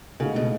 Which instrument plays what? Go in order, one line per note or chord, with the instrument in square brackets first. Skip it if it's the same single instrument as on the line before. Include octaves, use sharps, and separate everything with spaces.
[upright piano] A2 G#3 D#4 F#4 A4 [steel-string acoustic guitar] C#3
[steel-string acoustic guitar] B2